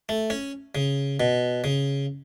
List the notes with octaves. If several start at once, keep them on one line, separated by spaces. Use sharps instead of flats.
A3
C#4
C#3
B2
C#3